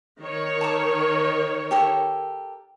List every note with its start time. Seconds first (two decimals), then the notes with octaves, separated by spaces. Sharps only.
0.20 D#3 C#5
0.61 A5 A#5 D6
1.71 G4 A4 A#4